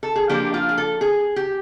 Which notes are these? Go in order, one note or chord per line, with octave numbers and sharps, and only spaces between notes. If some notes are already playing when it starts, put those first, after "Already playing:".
A4
G#4
F3 A#3 D4 G4
F4
G#4
A4
G#4
G4